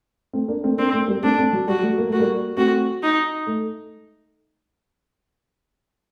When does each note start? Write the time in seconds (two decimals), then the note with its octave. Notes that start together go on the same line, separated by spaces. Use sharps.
0.33 A3 C4
0.48 A#3 D4
0.63 A3 C4
0.78 A#3 C4 D4
0.93 A3 C4
1.08 G3 A#3
1.23 A3 C4 D4
1.38 A3 C4
1.53 F#3
1.68 G3 F#4
1.83 F#3 A3
1.98 A#3
2.09 A3 F#4
2.19 G3 A#3
2.57 A3 C4 F#4
3.03 D#4
3.47 A3